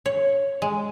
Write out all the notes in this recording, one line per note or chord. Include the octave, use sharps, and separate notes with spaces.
C#5
G#3